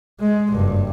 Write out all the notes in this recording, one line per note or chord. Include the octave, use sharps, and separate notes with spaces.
G#3
F#1 G2